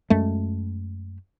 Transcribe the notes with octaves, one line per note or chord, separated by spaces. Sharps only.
F#2 G#3 A3